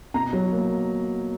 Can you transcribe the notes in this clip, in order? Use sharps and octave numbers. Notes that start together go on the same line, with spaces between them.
B2 A#5
F#3
A#3